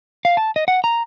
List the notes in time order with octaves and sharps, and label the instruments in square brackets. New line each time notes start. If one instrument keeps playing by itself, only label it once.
[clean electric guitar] F5
A5
D#5
F#5
A#5